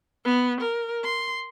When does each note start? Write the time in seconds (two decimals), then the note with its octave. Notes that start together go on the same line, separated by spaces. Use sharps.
0.25 B3
0.61 A#4
1.04 C6